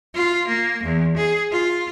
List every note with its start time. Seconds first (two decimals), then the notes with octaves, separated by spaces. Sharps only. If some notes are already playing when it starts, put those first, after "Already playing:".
0.15 F4
0.48 A#3
0.83 E2
1.17 G#4
1.51 F4